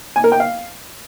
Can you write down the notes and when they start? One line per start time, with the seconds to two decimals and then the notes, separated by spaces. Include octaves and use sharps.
0.16 G#5
0.24 A#4
0.32 G5
0.40 F5